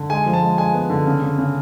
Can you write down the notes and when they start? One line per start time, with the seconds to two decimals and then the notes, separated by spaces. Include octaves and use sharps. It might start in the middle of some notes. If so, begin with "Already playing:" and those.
Already playing: D3
0.09 G#3 G#5
0.26 F3
0.33 A5
0.42 G#3
0.58 G#3 G#5
0.74 B3
0.90 D3
1.06 C#3
1.22 C#3
1.38 C#3